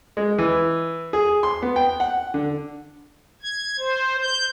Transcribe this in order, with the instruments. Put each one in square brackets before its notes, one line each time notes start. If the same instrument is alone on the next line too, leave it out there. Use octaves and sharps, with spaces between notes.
[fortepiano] G#3
E3
G#4
C6
B3
G5
F#5
D3
[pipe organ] G#6
C5
G6